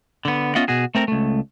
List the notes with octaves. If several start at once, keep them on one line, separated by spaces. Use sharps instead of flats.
D3 B3
B3 C#4 F4 D#5 E5 F#5
B2 F#4 G#4
A3 C4 A#4
C#2 A3